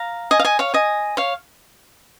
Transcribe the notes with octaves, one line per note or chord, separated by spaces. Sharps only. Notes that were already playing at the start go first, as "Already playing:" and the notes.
Already playing: F5 A#5
D#5 G#5
F5
D#5 G#5
C#5 F5
D#5 G#5
C#5 F5